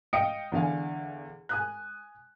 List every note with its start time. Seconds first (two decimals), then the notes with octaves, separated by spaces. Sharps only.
0.13 D#5 F5 G5 D#6 C#7 D7
0.52 E2 D3 F5 G#5
1.49 G#5 D#6 F#6